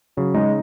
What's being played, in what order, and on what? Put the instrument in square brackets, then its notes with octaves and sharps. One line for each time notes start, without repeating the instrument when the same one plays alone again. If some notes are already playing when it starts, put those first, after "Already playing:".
[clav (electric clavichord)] C#3 [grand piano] F#3
[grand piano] G#3 [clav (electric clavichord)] D#4